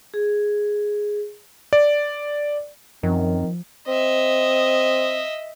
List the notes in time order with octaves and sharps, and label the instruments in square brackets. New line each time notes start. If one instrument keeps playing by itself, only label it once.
[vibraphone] G#4
[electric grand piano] D5
[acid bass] F#2 [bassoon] D#3 [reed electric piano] F3 [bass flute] C4
[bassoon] C4 [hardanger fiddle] D#5 E5